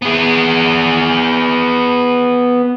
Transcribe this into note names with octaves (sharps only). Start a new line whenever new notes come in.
B3 G#4